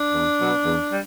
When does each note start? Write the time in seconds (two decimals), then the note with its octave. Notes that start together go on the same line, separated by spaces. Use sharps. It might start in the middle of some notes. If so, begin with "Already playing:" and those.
Already playing: D4
0.13 E2
0.39 B2 F#3 B3
0.65 E2
0.90 G3